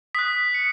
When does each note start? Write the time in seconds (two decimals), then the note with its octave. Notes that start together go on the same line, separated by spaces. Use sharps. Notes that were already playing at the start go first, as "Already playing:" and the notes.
0.15 D#6 F#6 B6
0.54 C#7